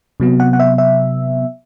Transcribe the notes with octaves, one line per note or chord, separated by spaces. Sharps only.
C3 F#3 B3
F#5
F#5
E5
E5